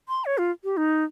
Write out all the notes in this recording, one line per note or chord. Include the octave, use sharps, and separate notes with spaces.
C6
C#5
F4
G4
D#4